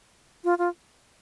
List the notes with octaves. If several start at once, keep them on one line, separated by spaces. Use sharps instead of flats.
F4
F4